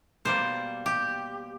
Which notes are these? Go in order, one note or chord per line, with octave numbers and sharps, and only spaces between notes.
B2 G3 A#3 C5
G4